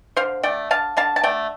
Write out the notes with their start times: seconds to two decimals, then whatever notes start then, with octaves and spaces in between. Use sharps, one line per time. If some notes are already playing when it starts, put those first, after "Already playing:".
0.16 D3 C5 F5
0.43 A3 D5 G5
0.71 D3 F5 A5
0.97 D3 F5 A5
1.16 A5
1.23 A3 D5 G5